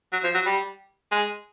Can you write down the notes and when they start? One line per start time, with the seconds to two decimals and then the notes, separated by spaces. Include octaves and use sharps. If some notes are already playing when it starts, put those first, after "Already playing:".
0.13 F#3
0.24 F3
0.34 F#3
0.46 G3
1.12 G#3